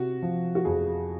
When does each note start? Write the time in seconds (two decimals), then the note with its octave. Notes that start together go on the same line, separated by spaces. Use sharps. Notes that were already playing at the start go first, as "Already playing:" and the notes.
Already playing: C3 F#4
0.22 F3
0.55 F#4
0.65 F2 G#4